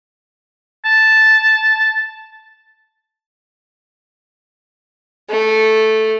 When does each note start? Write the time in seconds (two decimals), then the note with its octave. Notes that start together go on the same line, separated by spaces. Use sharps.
0.85 A5
5.30 A3